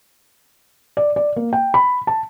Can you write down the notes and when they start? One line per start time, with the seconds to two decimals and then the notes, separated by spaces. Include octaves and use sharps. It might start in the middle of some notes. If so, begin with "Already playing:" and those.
0.97 D5
1.16 D5
1.36 A#3
1.53 G5
1.74 B5
2.07 A5